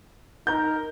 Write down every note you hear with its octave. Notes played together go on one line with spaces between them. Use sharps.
D#4 A#4 A#5 G6